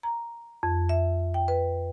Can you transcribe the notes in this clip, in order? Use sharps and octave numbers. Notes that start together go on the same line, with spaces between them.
A#5
F2
E5
G5
B4